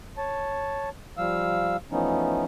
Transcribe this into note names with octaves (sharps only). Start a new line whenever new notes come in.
C#5 A5
F3 G3 F5 E6
E3 F3 A3 B3 C#4 D#4